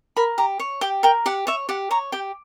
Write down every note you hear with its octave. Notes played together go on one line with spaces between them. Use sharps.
A#4 B5
G4 A#5
C#5
G4 G5
A#4 G5
G4 F#5
C#5 E5
G4 F#5
C#5 A#5
G4 G5